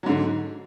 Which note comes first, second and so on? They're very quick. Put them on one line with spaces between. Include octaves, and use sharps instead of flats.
F#3 G#2 D3